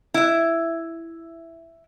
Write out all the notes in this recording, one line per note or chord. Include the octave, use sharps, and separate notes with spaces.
E4 E5